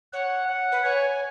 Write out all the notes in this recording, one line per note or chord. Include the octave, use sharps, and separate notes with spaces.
C#5 F#5
F#5
B4
C#5 G#5